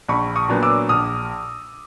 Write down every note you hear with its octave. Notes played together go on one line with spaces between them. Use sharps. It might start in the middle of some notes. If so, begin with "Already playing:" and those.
A#1 B5 C#6
C#6 D#6
A#2 F#3 B3 D4
D6 E6
A#1 D#6 F6